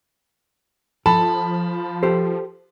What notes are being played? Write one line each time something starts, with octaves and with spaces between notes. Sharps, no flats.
F3 A4 A5 B5
G4 A4 C5